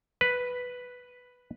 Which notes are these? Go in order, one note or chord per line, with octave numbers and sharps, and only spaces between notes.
B4